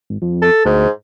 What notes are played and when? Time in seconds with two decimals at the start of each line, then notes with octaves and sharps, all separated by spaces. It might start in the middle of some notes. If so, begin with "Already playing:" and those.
0.10 G#1
0.22 F2
0.42 A4
0.65 D2 G#2